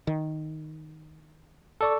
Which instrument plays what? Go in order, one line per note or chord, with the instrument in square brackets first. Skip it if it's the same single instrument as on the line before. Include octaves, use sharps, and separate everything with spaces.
[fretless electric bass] D#3
[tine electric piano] A4 D5 C#6